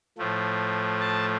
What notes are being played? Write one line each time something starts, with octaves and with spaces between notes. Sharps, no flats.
A2 F3 A3
A5